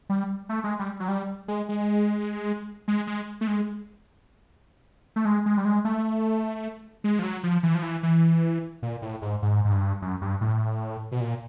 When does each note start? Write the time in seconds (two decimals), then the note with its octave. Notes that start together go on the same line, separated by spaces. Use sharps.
0.09 G3
0.49 A3
0.64 G#3
0.79 G3
1.00 F#3
1.08 G3
1.48 G#3
1.69 G#3
2.88 G#3
3.07 G#3
3.41 A3
3.47 G#3
5.16 A3
5.25 G#3
5.46 G#3
5.57 G3
5.65 G#3
5.85 A3
7.04 G#3
7.19 F3
7.23 F#3
7.43 F3
7.63 E3
7.75 F3
7.83 E3
8.03 E3
8.82 A#2
9.02 A2
9.22 G#2
9.42 G#2
9.65 G#2
9.72 G2
10.02 F#2
10.22 G2
10.41 A2
11.12 B2
11.20 A#2